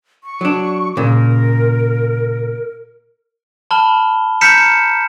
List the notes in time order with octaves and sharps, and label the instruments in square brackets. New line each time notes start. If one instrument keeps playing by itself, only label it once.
[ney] C#6
[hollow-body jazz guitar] F#3 D4
[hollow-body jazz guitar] A#2 C#3 [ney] A#4
[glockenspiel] A5 B5 F6 G7
A#5 F6 G6 B6 C#7 E7